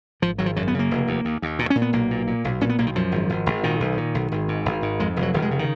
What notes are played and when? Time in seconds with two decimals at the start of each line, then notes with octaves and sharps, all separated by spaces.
0.22 G#1 F3
0.38 G#1 F#3
0.46 F3
0.56 F#2 F#3
0.68 B3
0.74 C#3 A#3
0.91 F1
1.07 D#2
1.25 D#2
1.42 D#2
1.59 A#2
1.70 C#4
1.75 A#2
1.82 B3
1.93 B1 A#3
2.11 A#2
2.27 A#2
2.45 B1
2.61 A#2 C#4
2.69 B3
2.78 B1 A#3
2.87 D#3
2.96 F#2 F3
3.12 G#1
3.30 G#1
3.46 G#1
3.63 A#2 D#3
3.80 B1
3.97 A#2
4.15 B1
4.32 G#1
4.48 G#2
4.66 G#1
4.82 G#2
4.99 F2 G#3
5.16 F1
5.22 F#3
5.34 F1 D#3
5.42 G#3
5.51 C#3
5.59 D#3